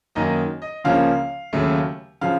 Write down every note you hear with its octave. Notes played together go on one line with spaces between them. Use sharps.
F#2 D#3 A#3 D#4 D#5
D#5
C#2 C#3 F3 A#3 C#4 F5
D#2 C#3 F#3 A3
C#3 F3 F5